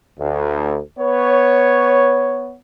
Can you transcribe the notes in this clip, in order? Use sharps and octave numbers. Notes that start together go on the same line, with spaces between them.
D2
B3 B4 C#5